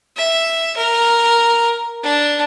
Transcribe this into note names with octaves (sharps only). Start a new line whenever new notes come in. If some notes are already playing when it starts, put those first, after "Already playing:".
E5
A#4
D4